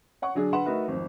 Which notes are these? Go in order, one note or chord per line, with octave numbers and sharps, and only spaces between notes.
C#5 F#5 C#6
D3 F#3 D4 G#4
D3 B4 F#5 C6 E7
A3 D#4 F#4 A#4 B4
G#1 F2